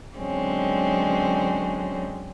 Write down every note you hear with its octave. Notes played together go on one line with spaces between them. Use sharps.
D3 F#3 G#3 C4 C#4